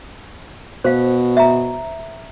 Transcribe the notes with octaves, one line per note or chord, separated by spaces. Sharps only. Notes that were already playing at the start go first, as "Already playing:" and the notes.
B2 C5 F5
E5 A#5